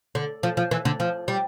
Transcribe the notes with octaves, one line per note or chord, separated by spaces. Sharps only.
D3
F3
F3
E3
D3
F3
G3